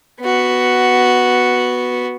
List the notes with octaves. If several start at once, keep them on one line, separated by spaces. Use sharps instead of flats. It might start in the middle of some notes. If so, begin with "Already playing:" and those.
B3 F#4